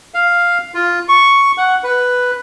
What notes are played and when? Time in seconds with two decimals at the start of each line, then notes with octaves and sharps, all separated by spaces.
0.14 F5
0.74 F4
1.09 C#6
1.58 F#5
1.84 B4